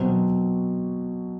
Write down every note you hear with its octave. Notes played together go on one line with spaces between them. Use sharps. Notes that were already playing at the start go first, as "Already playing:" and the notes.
Already playing: B2 F#3 C4 F#4